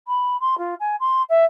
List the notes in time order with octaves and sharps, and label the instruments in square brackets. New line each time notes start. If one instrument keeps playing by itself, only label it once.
[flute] B5
C6
F4
G#5
C6
E5